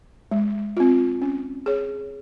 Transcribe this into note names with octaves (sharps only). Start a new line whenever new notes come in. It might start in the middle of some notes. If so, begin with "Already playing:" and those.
G#3
C4 F4
C#4
G#4 C#5